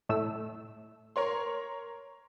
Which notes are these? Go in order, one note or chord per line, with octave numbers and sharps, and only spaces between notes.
A2 A3 E6
A#4 C#5 C6